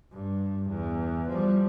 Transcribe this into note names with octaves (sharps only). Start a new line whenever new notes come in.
G2
E2
F3 G3